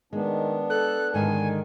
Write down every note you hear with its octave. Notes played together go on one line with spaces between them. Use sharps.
D#3 G#3 B3 D4
A4 F#6
G#2 D3 D#3 G#3 G#5